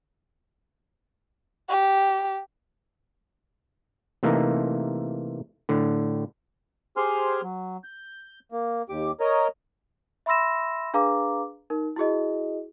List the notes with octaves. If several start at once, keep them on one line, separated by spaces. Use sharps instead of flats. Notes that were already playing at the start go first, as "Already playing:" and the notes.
G4
C3 E3 A3 A#3 D#4
A2 D3
G4 G#4 C5 G#5 C6 F6
F#3
G6
A#3
D#2 G4 D6
A#4 C#5 D#5
E5 B5 C6 E6 A#6 E7
D4 G#4 B4 F5 A#5 D6
D#4 A#4
E4 F#4 G#4 D#5